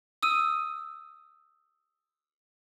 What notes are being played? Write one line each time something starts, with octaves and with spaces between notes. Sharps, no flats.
D#6 E6 D#7